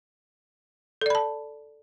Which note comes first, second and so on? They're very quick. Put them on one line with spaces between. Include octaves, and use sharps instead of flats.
A4 D5 B5 A5